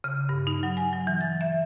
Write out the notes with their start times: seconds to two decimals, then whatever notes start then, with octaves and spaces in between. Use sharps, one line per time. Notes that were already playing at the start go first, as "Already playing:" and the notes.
0.04 C#3
0.29 G2
0.47 D#4
0.63 F#3
0.77 G#5
0.92 F#3
1.07 E3
1.21 A6
1.41 E5